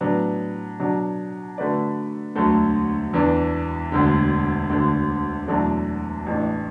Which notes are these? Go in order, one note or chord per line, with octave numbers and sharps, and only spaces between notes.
A2 F#3 B3 D4
B2 F#3 D4
D3 A3 F#4 B4 D5
E1 D2 D3 F#3 A3
E2 E3 B3 D4
E1 D2 D3
E1 D2 D3
E2 B2 F#3 A3 D4
A1 A2 E3 D4